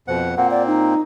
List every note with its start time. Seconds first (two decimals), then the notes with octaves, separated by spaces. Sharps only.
0.08 F2 B2 C5 F#5
0.37 A#2 A#3 C4 F#5
0.51 D5
0.67 D#4